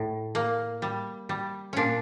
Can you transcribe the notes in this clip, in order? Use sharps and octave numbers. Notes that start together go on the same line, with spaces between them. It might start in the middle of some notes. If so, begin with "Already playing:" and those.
Already playing: A2
A#3
G3
G3
A#2 C#4 D4